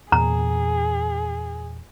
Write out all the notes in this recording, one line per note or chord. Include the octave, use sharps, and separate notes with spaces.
E2 A#2 G#4 A#5